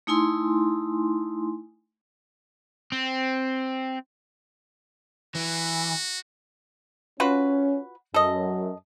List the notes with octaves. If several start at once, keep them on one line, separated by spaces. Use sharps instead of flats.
A3 D#4 E4 G#5 C6
C4
E3 F#4
C#4 F4 F#4 B4
F#2 A4 D#5